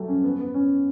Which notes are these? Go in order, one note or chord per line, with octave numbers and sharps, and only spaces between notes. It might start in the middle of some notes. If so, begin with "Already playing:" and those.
Already playing: F#3 G3 A3
C#4
B3
B3
C#4